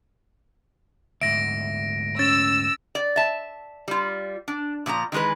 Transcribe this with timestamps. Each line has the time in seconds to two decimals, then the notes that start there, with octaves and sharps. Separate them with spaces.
1.21 D2 G#2 E5 A#6 D7
2.19 C#4 E6 A6
2.95 D5
3.16 E5 A5
3.88 G3 F4
4.48 D4
4.86 A#2 F3 E4 A#5
5.12 D#3 E3 G#3 G#4 B4